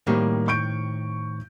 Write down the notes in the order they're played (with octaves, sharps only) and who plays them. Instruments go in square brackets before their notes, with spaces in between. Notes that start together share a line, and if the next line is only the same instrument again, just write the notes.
[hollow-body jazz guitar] A2 D#3 C4 [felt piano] G3 A#3
[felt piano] C#6 G6 D7